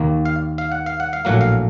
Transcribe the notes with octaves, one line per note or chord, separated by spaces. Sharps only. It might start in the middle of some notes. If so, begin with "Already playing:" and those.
Already playing: D#2 D#3 A#3
F5
F5
F#5
F5
F#5
F5
A#1 A2 F#3 A#3 F#5
F5